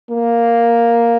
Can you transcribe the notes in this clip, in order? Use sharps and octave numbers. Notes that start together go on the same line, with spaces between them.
A#3